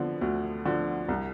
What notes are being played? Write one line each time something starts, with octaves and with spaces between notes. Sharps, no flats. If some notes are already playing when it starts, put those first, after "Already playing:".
Already playing: D3 F3 B3 C4
D2
D3 F3
C2